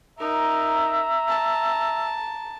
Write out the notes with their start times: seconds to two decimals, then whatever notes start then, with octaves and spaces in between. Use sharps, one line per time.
0.19 D#4 A#4 E5 A#5
1.28 A5